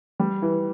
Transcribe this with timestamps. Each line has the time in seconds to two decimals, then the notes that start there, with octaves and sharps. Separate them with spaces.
0.19 G3
0.42 E3